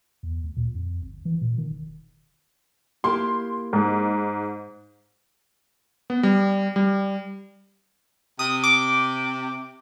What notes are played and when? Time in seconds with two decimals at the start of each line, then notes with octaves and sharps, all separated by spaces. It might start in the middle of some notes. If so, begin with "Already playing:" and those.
0.23 E2
0.44 D2
0.57 A#2
0.75 F2
1.02 G1
1.25 E3
1.41 A#2
1.58 D#3
1.71 E1
3.04 A#3 E4 G4 C6
3.73 G#2
6.10 B3
6.23 G3
6.76 G3
8.39 C3 D#6
8.64 D6